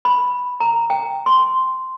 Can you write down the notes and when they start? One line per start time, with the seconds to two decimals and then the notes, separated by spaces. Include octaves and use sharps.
0.05 B5
0.60 A#5
0.90 G5
1.26 C6